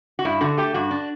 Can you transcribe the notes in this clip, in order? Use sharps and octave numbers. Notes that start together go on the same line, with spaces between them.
F#4
G2 E4
D3 F#4
A3 G4
G2 F#4
D4